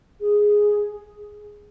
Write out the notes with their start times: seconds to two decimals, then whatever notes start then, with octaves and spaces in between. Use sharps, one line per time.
0.21 G#4